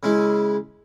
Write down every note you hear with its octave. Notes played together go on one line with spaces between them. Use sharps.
C#3 G#3 E4